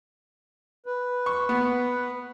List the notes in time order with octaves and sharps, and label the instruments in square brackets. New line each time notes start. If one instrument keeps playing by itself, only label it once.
[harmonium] B4
[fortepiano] C#6
B3